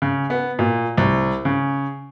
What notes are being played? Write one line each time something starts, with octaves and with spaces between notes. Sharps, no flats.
C#3
B3
A#2
C2
C#3